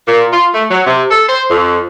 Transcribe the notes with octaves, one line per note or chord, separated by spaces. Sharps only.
A#2
F4
A3
F#3
C3
A4
C5
F2